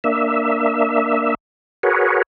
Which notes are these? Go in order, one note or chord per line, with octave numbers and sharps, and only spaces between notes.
A#3 D4 E5
F#4 G#4 A#4 B4 C#5